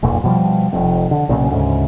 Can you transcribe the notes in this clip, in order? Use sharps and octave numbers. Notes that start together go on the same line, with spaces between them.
F1 B1 A#2
B2 F3 G3
F1 F2 C3
D3
B1 A#2 C#3
D2 G#2 C#3